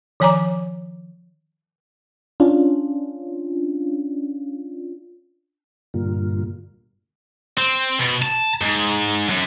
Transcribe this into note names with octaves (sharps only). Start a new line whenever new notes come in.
D#3 F3 C#5 G#5 A#5 D6
C#4 D4 F4
G2 A#2 D3 G3 A#3 F4
C4
B2
A5
G#2
F#2